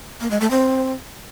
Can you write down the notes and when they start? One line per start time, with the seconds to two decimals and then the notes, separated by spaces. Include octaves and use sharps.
0.21 A#3
0.31 G#3
0.41 A3
0.51 C4